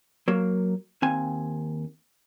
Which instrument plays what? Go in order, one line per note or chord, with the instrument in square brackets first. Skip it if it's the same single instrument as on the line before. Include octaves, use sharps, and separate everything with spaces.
[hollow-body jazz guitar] F#3 A#3
D#2 C4 G#5